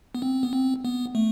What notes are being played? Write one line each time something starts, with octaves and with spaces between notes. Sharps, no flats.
B3
C4
B3
C4
B3
A3